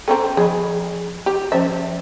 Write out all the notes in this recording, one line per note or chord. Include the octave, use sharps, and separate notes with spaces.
C4 C#4 A4 G5 A#5
F3 G#4 D#5 B5
G4
F3 C#4 C5 E5